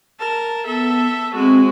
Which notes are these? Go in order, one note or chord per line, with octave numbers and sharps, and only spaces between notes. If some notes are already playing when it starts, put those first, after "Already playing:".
A#4 A5
B3 A4 E5
G#3 C4 F#4